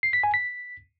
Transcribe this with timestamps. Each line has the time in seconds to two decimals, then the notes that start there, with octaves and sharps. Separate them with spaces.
0.03 C7
0.13 B6
0.23 G#5
0.34 B6